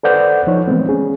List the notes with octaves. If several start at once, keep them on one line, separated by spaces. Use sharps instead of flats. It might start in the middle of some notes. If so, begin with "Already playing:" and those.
A4 B4 C5 D5 F#5 G6
F3 D#4 C#5
E3 G#3 A3 B3 C4
C#4 G#4